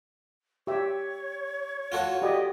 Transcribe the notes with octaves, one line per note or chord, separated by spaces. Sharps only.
G4 C#5 E5
F4 F#4 A4
G4 D5 D#5